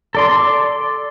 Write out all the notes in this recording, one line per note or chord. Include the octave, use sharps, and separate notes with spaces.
A4 D5 C6